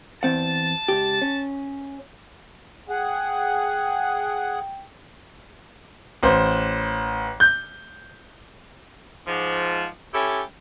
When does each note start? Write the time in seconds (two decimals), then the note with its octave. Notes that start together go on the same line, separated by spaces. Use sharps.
0.23 E2 C4 F#5 A5
0.88 C#2 G4
1.22 C#4
2.89 G#4 F#5 G5
6.23 A1 C5
7.40 G6
9.27 G#2 F3
10.14 C#4 E4 G4 A4